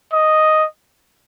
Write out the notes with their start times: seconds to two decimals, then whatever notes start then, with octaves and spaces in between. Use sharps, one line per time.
0.13 D#5